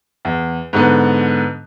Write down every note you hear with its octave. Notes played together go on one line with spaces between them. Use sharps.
E2
G#2 D3 B3